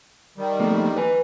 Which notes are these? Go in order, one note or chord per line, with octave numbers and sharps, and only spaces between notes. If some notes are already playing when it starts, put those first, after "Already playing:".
D#3 G3
F2 A3 A#3
B4 G#5